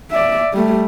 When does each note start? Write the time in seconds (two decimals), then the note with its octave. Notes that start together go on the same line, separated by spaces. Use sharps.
0.11 D5 E5
0.54 G3 A3